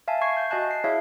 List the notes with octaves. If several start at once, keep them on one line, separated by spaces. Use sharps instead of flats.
E5 F5 G#5 A5
C#6 G#6 C7
G6
F#4 D#5 G#5 A5 F#6
C7
E4 F#4 G#4 C#5 E5 F5